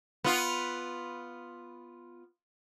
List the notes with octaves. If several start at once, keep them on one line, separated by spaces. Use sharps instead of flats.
B3 F4